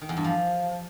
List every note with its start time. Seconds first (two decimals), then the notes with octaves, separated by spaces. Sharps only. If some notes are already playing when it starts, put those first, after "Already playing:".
0.01 D#3
0.09 E2
0.17 G2
0.24 F3